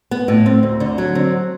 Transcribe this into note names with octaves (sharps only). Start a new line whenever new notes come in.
B3
A2
C4
D2
D3
F#3
C4